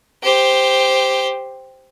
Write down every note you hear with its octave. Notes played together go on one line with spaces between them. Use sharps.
G4 C5